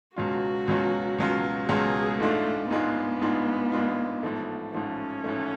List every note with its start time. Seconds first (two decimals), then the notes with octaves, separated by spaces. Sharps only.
0.16 C#2 B2 F#3 C#4 F4 F#4
0.68 C#2 B2 F#3 C#4 F4
1.19 C#2 B2 F#3 C#4 F4
1.69 C#2 B2 F#3 C#4 F4 G#4
2.20 A1 G#2 G#3 A3 D4 F4
2.70 A1 G#2 G#3 B3 D4 F4
3.21 A1 G#2 G#3 D4 F4
3.72 A1 G#2 G#3 D4 F4
4.23 A1 G#2 F3 A3
4.73 A1 G#2 F3 A3 C#4
5.24 A1 G#2 F3 A3